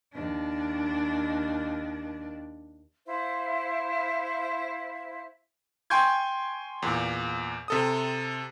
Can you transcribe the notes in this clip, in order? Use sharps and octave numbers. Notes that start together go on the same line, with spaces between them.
D#2 D4
E4 C5 E5 F5
G5 G#5 C6 C#6 G6 G#6
E2 A#2
C3 A4 D#6